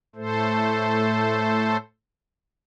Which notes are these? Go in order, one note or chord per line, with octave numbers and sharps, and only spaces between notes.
A2 A3 A4 C5